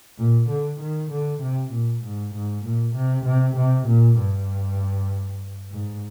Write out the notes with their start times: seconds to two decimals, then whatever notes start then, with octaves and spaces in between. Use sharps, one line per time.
0.18 A#2
0.49 D3
0.80 D#3
1.11 D3
1.42 C3
1.72 A#2
2.03 G#2
2.34 G#2
2.65 A#2
2.96 C3
3.26 C3
3.57 C3
3.87 A#2
4.18 G2
5.71 G#2